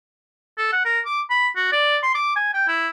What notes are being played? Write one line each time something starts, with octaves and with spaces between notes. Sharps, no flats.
A4
F#5
A#4
D6
B5
F#4
D5
C6
D6
G#5
G5
E4